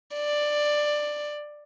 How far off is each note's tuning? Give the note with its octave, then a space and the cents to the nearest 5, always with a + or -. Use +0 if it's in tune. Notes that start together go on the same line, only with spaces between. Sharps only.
D5 +10